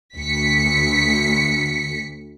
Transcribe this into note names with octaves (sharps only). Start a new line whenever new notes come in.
D2 B6 C#7